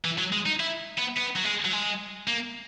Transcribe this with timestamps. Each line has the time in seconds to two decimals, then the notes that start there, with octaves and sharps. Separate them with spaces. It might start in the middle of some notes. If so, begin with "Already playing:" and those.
0.05 E3
0.18 F#3
0.33 G#3
0.46 D#4
0.60 E4
0.98 B3
1.17 B3
1.36 F#3
1.44 G#3
1.65 F#3
1.72 G#3
2.28 A#3